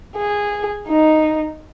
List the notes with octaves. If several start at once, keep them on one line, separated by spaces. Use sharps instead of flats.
G#4
D#4